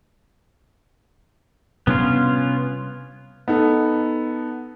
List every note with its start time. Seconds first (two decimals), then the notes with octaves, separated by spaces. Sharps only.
1.87 C3 G3 B3 C#4 D4 F4
3.48 B3 D#4 A4